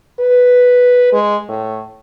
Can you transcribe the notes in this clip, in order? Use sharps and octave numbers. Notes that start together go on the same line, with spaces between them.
B4
G#3
A2